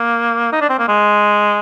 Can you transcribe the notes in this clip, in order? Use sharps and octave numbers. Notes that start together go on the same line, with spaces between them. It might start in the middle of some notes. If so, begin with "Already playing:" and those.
Already playing: A#3
D#4
D4
C4
A#3
G#3